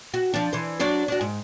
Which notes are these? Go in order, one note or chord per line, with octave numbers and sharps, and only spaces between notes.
F#4
F3 D4
E3 C5
F#3 D4 C5
D4 F#4
G#2